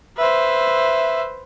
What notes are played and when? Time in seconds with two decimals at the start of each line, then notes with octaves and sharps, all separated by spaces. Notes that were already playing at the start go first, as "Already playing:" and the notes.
0.18 B4 C5 E5